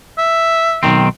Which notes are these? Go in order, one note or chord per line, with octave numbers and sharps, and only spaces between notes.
E5
B1 D#3 C4